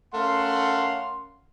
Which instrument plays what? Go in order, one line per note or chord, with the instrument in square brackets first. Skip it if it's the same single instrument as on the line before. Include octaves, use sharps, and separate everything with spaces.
[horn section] A3 C#4 A#4 F5 F#5 C6